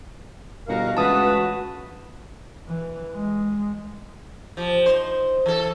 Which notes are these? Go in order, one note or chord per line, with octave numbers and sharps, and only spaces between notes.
G1 B2 F#4 A#4 F5
C#2 E3 A3 F#4 B4 A5 D#6
E3
G#3
F3 G4
D#4 C5
E3 A4